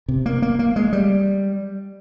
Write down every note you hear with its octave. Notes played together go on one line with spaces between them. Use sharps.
C3
A#3
A#3
A#3
G#3
G3